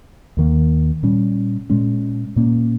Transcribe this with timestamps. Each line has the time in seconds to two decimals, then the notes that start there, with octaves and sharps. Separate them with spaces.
0.37 D#2 D#3 A#3
1.03 A#2 G3 C#4
1.70 A#2 G#3 C#4
2.36 A#2 A#3 C#4